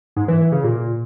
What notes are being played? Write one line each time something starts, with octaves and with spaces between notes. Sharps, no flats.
G#2
E3
E3
C#3
A#2